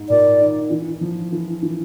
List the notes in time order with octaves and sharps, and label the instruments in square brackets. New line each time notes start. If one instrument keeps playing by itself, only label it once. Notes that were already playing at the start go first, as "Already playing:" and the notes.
Already playing: [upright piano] G#2
[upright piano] A#2 [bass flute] D5
[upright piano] D#3
E3
F3
E3
E3